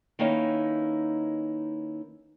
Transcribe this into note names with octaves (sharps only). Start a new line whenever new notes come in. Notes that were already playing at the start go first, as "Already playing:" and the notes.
D#3 A#3 C#4 D#4 E4 B4